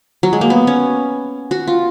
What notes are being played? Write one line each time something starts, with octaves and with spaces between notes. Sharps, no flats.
F#3
G#3
A#3
B3
C#4
F#4
F4